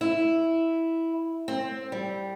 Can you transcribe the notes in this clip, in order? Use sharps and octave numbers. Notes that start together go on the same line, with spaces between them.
E4
C4
G3